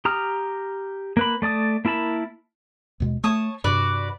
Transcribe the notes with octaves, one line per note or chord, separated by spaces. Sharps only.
G4 A#5 D#6 F6
A#3 B4 B5
A3 D5 A5 D#6
A#3 E4 A#4 A5 B5
D#2 B2 G#3
A3 C#5 A5 D#6
G2 C3 F#4 B4 D5